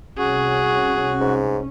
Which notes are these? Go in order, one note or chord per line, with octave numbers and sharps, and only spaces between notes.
C2 C#4 F#4 G#4
G#2